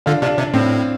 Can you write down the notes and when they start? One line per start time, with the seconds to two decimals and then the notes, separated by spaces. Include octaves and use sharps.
0.06 D3 D4 F4
0.22 C3 D4 F4
0.38 C3 D4
0.54 A2 C4